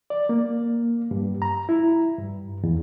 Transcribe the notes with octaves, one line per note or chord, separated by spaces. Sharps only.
D5
A#3
G2
A#5
E4
G2
E2